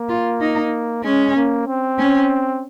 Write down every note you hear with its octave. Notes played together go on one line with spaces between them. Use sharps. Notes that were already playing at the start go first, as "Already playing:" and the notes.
Already playing: A#3
F4
D#4
G#3 C#4
A#3
C4
C#4